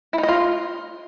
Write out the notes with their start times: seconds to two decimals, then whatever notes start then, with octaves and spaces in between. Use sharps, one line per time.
0.13 E4
0.18 D#4
0.23 D#5
0.29 F4